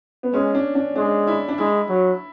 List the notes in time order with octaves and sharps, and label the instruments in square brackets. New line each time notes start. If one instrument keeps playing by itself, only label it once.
[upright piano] B3
[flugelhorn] G#3 [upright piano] C#4
[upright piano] D4
D4
[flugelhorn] G#3 [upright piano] D4
[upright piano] E4
D4
[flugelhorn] G#3 [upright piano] E4
[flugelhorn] F#3